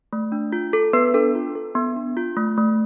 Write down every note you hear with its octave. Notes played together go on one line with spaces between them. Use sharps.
A3
D4
F4
A4
B3 B4
D4 A4
F4
A4
B3
D4
F4
A3
A3